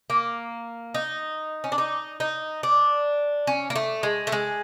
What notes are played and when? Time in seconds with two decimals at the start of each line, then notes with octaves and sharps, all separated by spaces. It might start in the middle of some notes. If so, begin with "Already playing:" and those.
0.10 A#3
0.95 D#4
1.64 C#4
1.72 D4
1.78 D#4
2.20 D#4
2.63 D4
3.47 C#4
3.70 A#3
3.76 A3
4.03 G#3
4.27 A3
4.32 G#3